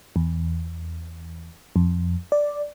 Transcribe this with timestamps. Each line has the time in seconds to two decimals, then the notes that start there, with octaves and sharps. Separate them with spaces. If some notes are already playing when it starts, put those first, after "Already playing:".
0.16 E2
1.76 F2
2.32 D5